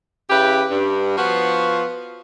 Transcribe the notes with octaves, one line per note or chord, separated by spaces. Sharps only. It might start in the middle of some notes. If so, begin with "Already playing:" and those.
C#3 E4 G4 B4
G2
F3 B3 F4 F#4